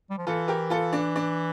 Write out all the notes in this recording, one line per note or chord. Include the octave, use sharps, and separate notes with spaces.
G3
F3
E3 F4 A4
G4 A#4
F4 A4
D4
D4